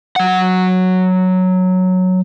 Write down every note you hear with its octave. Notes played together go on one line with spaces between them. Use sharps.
F#3 F#5